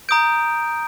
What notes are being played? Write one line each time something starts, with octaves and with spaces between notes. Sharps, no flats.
A#5 D#6 G6 D7